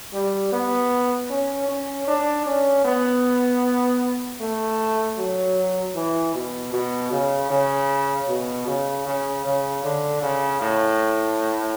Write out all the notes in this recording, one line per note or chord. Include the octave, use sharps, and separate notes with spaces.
G3
B3
C#4
C#4
D4
C#4
B3
A3
F#3
E3
B2
B2
C#3
C#3
B2
C#3
C#3
C#3
D3
C#3
A2